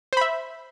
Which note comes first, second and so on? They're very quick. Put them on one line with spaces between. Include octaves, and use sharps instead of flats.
C5 B5 E5